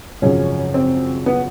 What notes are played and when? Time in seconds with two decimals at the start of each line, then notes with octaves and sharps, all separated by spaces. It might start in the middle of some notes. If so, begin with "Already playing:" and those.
0.22 G#1 F#2 C#3 F3 C#4
0.74 C4
1.26 B3